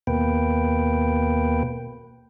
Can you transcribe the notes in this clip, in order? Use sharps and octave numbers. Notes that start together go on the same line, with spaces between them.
D#2 B2 A#3 B4 G5